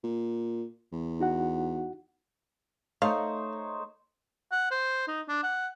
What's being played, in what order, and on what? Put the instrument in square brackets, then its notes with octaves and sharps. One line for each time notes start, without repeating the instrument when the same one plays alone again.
[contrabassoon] A#2
E2
[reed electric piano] D#4 F#4 F#5
[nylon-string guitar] A3 [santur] D#4 C5 C#5 [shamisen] F5
[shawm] F#5
C5
D#4
D4
F#5